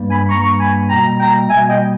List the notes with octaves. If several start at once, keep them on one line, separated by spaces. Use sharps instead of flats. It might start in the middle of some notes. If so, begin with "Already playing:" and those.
Already playing: G2 G3 A#3
G#5 B5
G2 G3 A#3 A#5 C#6
G#5 B5
B2 G3 A#3 G5 A#5
G5 A#5
B2 G3 A#3 E5 G#5
D#5 G5